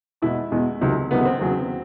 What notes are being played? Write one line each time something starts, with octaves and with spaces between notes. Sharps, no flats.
E2 B2 G#3 E4
E2 B2 G#3
C#2 C3 D#3 F#3
C#2 C3 D#3 F#3 B3
B3
C4
E2 C#3 F#3